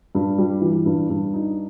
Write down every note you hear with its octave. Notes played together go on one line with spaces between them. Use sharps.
G2
G3
E3
G2
G2
D#4